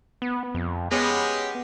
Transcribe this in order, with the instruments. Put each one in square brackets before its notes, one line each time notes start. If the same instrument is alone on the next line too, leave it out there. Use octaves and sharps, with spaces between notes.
[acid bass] B3
F2
[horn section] G#3 C#4 G4 [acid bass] B3